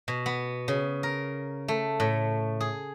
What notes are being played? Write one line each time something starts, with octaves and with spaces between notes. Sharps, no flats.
B2
B3
C#3
A#4
A3
A2
G#4